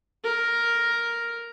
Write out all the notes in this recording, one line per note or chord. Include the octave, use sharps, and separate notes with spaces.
A#4